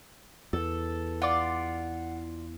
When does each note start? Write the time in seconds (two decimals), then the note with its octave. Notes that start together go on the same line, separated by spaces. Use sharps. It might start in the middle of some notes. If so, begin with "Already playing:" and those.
0.53 E2 A4
1.22 F4 D5 F#5